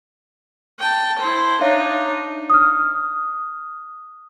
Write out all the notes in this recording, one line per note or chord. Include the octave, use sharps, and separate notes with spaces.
G5 A5
E4 C5
D4 D#4 C#5 E5 F5
D#6 F6